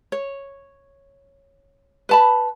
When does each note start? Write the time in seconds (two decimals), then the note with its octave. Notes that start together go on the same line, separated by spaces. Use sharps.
0.12 C#5
2.09 B4 A5 B5